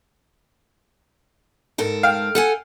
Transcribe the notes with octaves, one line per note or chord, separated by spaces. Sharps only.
G#2 A4 A#4
F5 G5
A4 F#5 G#5